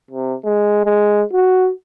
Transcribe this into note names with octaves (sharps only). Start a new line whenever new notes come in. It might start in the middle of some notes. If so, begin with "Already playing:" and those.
C3
G#3
G#3
F#4